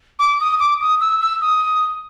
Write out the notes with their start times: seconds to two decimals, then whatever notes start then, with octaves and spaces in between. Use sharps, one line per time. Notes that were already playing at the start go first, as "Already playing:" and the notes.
0.19 D6
0.40 D#6
0.60 D6
0.81 D#6
1.01 E6
1.21 E6
1.41 D#6